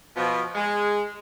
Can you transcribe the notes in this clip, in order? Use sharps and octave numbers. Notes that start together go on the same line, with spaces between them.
B2 F3
G#3